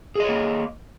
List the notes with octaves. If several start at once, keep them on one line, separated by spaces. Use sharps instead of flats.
A#3 G#4 C#5 D#5